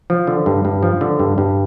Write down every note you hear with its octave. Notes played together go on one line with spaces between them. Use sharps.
F3
D3
G2
G2
F3
D3
G2
G2